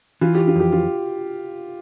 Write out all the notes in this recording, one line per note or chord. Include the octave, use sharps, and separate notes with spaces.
E3 F4
G4
F4
F2 G4
F4